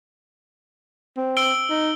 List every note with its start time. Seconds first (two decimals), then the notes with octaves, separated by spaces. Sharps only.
1.17 C4
1.37 E6 D7 G7
1.70 D#4